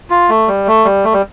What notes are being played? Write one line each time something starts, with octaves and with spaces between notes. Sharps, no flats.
F4
A3
G3
A3
G3
A3
G3